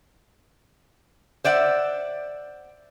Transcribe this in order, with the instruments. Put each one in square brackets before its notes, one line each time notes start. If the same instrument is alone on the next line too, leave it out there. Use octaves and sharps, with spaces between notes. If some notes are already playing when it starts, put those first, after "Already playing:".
[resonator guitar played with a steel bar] C5 D5 E5 F#5